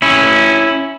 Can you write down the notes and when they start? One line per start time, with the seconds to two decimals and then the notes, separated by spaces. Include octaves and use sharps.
0.02 C#4 E4